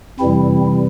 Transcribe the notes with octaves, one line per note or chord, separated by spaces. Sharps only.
F2 C3 E3 G3 C4 E4